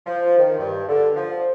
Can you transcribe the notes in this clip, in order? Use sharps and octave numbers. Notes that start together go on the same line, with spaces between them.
F3
D#3
G2
D3
F3